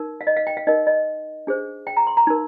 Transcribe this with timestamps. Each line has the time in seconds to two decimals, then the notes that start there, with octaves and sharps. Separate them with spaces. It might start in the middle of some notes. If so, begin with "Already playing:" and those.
Already playing: D#4 A#4
0.21 F5
0.27 D#5
0.37 F5
0.47 G5
0.57 F5
0.67 D#4 A#4 D#5
0.87 D#5
1.47 D4 G#4 C5
1.87 G5
1.97 A#5
2.07 C6
2.17 A#5
2.27 D#4 A#4